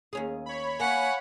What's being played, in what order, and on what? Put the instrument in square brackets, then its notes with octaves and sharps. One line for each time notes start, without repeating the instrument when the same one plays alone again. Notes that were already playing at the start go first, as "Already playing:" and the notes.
[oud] D#2 C#4 G#4
[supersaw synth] C#5 B5
[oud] A#3 [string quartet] F#5 [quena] G#5